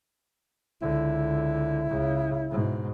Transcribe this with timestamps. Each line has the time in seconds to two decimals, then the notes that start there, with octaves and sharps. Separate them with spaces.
0.82 C#2 D3 E4
1.90 C#2 C#3
2.50 G#2 B2